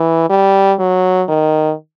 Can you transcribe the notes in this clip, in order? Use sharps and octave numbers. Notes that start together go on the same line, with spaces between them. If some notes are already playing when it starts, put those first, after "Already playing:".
Already playing: E3
G3
F#3
D#3